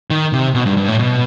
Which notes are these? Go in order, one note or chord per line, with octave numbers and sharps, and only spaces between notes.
D#3
C3
B2
G2
G2
A2
B2